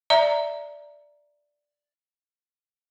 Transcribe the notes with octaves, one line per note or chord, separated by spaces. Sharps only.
D5 E5 A#5